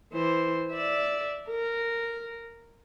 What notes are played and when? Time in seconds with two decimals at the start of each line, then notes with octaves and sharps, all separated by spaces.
0.13 E3 C5
0.72 D5 E5
1.49 A#4